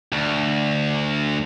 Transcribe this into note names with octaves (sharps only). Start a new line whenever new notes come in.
D2